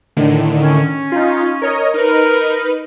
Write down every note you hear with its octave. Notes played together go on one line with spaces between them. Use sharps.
A2 D3 D#3
C#4
D#4 F4
A#4 C#5 D#5
D#4 A#4 B4